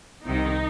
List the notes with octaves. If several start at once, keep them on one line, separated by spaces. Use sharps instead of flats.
C2 C3 D#3 D#4